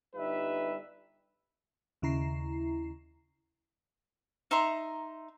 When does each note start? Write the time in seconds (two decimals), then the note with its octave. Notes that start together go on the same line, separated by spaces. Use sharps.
0.15 G1 G3 D#4 B4 E5
2.02 D#2 C#3 E4 A#5 C7
4.51 D#4 E5 A#5 C6